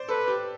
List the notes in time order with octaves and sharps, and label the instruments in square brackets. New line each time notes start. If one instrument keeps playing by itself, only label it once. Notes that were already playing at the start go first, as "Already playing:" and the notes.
Already playing: [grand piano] C5 D5
[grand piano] A4 [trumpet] B4
[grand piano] G4